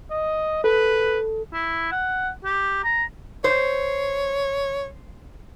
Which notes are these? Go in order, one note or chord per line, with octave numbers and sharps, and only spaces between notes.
D#5
A4 B4
E4
F#5
G4
A#5
C5 C#5